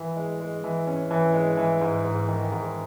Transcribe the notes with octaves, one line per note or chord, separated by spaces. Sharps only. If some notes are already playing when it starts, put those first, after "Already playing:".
Already playing: E3
G#3
G#3
E3
C#4
E3
G#3
E3
G#2
G#2
D#3
G#2